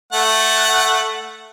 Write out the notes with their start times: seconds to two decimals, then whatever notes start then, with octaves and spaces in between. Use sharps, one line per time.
0.13 A3 F#5